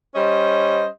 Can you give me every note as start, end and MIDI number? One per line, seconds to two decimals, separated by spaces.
0.15 0.85 55
0.15 0.85 61
0.15 0.85 72
0.15 0.85 75